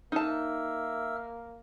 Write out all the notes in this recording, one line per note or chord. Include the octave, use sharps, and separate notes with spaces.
A#3 D#4 E5 A5 E6 F6